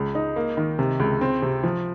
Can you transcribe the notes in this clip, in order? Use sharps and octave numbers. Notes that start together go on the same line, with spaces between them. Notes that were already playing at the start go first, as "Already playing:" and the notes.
Already playing: C#2
D#4
A#3
D#3
C3
C#2
C4
C3
F3